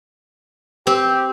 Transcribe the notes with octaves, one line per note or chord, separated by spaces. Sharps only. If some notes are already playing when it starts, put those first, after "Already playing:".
C4 G4